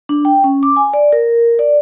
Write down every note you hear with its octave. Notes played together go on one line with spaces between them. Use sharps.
D4
G5
C#4
D6
G#5
D5
A#4
D5